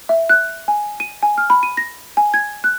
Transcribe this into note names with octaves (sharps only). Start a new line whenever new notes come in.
E5
F#6
G#5
D#7
G#5
F6
B5
D#7
A#6
G#5
G#6
F#6